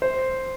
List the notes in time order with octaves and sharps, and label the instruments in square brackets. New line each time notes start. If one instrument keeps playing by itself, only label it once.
[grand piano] C5